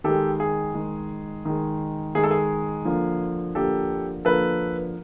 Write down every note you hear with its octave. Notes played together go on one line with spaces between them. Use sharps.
D#3 G#3 G4 A4
G#4
D#3 G#3
D#3 G#3
D#3 G#3 G#4
A4
G#4
D3 F3 A#3
D3 F3 A#3 G4 A4
D3 F3 A#3 A4 B4